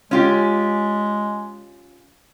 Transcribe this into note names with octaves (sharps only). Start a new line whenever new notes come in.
G#3 C#4 F4 G4